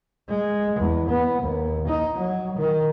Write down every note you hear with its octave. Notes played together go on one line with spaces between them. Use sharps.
G#3
E2
B3
D#2
D#4
F#3
D#3